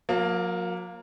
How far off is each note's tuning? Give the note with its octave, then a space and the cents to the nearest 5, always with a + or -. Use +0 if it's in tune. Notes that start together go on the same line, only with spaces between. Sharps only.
F#3 -45 A#3 +0